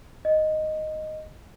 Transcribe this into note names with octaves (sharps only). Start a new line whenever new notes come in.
D#5